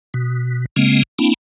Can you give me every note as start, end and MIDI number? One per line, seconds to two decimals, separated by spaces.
0.14 0.66 47
0.76 1.03 49
0.76 1.03 56
0.76 1.03 58
0.76 1.03 60
1.19 1.34 58
1.19 1.34 60
1.19 1.34 62
1.19 1.34 64